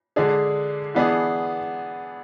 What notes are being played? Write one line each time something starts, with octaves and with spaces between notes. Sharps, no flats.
D3 G#3 D4 G#4
E3 B3 D4 G#4